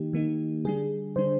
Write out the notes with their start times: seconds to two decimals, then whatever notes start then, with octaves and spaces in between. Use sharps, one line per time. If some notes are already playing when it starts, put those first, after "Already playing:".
Already playing: D#3 A#3 D#4 G4
0.13 D#3 A#3 D#4
0.65 D3 G3 D4 G#4
1.16 D3 G3 D4 C5